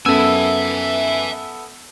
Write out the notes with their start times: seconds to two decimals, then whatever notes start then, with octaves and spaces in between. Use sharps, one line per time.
0.06 F#2 B3 A4 E5 G#5 E6